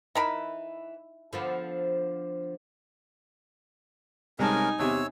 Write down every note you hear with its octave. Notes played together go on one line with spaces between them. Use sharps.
E3 D#4 A#4 B5
D3 F3 B3
C2 G#3 C#4 D#4 A#4 G#5 A5
E2 C3 C#5 E6